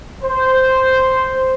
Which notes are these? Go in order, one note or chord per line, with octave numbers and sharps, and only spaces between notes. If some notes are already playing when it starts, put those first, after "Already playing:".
C5